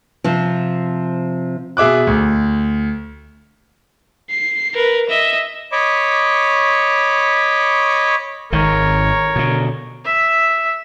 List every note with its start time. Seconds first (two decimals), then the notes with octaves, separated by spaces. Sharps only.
0.24 C3 F3
1.77 B2 G#4 E5 D6 F#6
2.07 D2
4.30 C7
4.74 A#4 B4
5.09 D#5 E5
5.72 C#5 D#5 B5 C#6 D6
8.53 G#1 G#2 D#3 A#4 C#5
9.36 B2 D3
10.05 E5